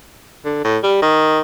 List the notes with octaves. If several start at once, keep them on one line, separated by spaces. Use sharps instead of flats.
D3
A2
G3
D#3